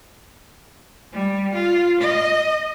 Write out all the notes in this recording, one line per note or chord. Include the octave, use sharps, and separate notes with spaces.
G3
F4
D#5